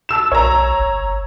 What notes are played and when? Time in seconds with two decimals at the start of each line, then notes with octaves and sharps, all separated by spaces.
0.09 A5 E6 E7
0.32 B1 C#5 A#5
0.80 G1